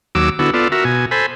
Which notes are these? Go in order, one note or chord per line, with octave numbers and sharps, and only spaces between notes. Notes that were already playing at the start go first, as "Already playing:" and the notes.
D#2 F#3 D6 E6
D3 B3 E4 F#4
B3 F4 A4 D5
F#4 A#4 E5
B2 G#5
A4 C5 G#5 B5